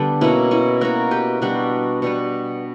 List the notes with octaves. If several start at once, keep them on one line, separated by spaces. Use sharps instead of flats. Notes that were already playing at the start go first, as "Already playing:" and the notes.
Already playing: D3 G3 B3 D4
B2 A#3 C#4 E4
C#4 E4
B2 A#3 F#4 A#4
G4 B4
B2 G3 B3 D4 F#4
B2 G3 B3